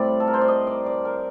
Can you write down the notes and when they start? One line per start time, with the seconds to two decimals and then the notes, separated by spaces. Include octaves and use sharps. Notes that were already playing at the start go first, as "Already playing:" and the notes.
Already playing: A2 G3 C4 D5
0.20 A4
0.28 A#4
0.34 C5
0.41 D5
0.48 D#5
0.67 D5
0.86 D5
1.05 A#4